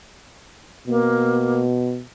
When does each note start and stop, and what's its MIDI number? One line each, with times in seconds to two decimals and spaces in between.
0.87 2.02 47
0.87 1.63 58